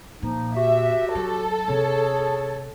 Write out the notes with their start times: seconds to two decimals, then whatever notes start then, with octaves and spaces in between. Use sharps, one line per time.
0.23 A#2 F3 A#3 D#4
0.55 F#4 G4 E5
1.15 F#3 A4
1.68 C3 G#4 C#5